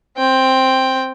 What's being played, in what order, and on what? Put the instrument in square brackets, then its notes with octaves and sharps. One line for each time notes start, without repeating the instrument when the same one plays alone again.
[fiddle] C4 G5